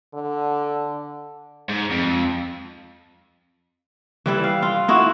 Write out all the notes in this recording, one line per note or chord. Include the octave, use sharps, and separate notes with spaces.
D3
G#2
F2
E3 G3 E4
F5
F4
D#4 E4 F#4